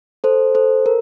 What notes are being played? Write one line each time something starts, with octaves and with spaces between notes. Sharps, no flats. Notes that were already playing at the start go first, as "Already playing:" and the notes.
A4 C5
A4 C5
A#4